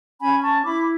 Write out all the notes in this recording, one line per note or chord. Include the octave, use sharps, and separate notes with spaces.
C#4 G#5 B5
A5 C#6
E4 B5 D6